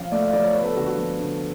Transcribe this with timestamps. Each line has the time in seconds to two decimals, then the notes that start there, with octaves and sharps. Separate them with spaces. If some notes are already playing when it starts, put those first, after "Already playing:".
Already playing: F3 C#4 F5
0.12 A3 D5
0.22 F5
0.33 F3 D5
0.43 C#5
0.54 B3 B4
0.65 A4
0.76 D3 F#4
0.87 F#4
0.98 F3
1.20 D3